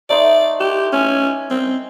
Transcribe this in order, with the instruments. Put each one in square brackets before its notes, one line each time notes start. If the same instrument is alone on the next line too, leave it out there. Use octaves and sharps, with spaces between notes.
[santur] A3 D#4 C6 [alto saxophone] D5
[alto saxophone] G4
[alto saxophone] C#4 [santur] G#5
[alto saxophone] C4